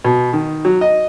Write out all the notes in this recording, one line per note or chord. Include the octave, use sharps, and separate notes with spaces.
B2
D#3
F#3
D#5